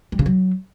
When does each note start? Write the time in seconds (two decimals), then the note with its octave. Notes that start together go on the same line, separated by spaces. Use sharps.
0.12 G3
0.19 C#3
0.26 F#3